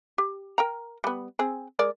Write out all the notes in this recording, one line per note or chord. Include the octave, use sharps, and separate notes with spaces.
G4
A#4 G5 A#5
G3 B3
C4 G#4
G#3 A#4 D5